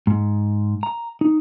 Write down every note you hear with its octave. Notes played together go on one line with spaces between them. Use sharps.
G#2
A#5
D#4